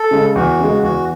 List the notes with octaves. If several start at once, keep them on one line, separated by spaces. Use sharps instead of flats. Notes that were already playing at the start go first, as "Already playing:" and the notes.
Already playing: A4
C#3 G#3
E2 F#4
C#3 G#3
E2 F#4